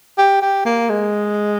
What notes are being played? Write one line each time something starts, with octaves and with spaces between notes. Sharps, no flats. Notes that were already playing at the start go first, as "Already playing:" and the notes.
G4
G4
A#3
G#3